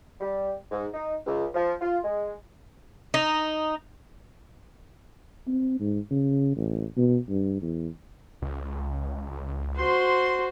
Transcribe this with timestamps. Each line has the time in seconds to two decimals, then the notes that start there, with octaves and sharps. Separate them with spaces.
0.20 G3
0.71 G#2
0.93 D#4
1.26 C#2
1.54 F3
1.81 F4
2.03 G#3
3.14 D#4
5.48 C4
5.80 G#2
6.11 C#3
6.56 A1
6.97 B2
7.29 G2
7.62 E2
8.42 C#2
9.78 F#4 C5 C6